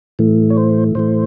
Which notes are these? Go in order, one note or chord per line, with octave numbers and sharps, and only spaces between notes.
A2 E3 A3
C#5
C5
A2 E3 A3 C5